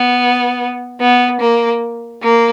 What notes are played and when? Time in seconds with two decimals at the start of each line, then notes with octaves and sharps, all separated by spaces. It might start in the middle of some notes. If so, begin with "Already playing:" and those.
Already playing: B3
1.01 B3
1.41 A#3
2.22 A#3